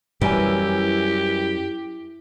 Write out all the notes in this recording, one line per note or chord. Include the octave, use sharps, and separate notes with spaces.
F#2 E3 G3 G4 G#5